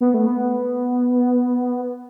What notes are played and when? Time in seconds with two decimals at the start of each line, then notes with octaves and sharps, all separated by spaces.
0.01 B3
0.14 A3
0.26 B3